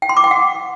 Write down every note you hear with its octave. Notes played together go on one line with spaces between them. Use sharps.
G5
C6
D6
G5
F#5